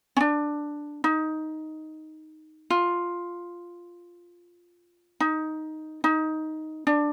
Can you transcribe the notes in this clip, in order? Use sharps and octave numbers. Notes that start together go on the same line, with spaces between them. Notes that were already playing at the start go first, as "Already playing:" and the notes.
C#4
D4
D#4
F4
D#4
D#4
D4